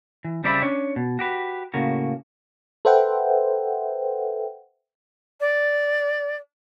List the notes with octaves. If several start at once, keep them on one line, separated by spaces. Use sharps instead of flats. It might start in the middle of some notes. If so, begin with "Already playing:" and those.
E3
C#3 G3 C4 D5 E5 B5
C#4 D4 C#5
B2
F#4 G4 B4
A2 C#3 A#3 F#4
A4 B4 C5 E5 F#5 G5
D5